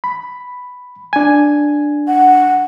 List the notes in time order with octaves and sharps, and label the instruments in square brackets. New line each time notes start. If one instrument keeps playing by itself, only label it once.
[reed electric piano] B5
D4 G#5
[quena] F#5